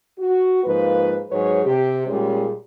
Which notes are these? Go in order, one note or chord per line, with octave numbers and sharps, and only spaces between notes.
F#4
G#2 F3 A#3 B4
G#2 F#3 G#4 B4 C#5
C3 G4
A#2 G3 G#3 C#4 G#4